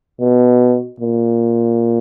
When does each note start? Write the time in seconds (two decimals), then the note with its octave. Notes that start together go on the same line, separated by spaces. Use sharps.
0.21 B2
1.00 A#2